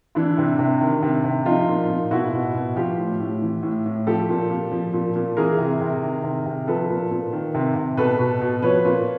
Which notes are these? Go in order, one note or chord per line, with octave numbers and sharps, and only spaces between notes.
E3 D4 E4
C3
C3
D#3
C3
C3
F3 D#4 F4
A#2
A#2
B2 E4 F#4
B2
B2
F3 F4 G4
A2
A2
E3
A2
A2
F3 G4 A4
A#2
A#2
F3
A#2
A#2
E3 G#4 A#4
C3
C3
D#3
C3
C3
F3 A4 B4
A#2
A#2
D#3
C3
C3
B2 A4 B4
B2
B2
F3 B4 C#5
A#2